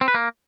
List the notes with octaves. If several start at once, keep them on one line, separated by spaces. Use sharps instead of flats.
C4
B4
A#3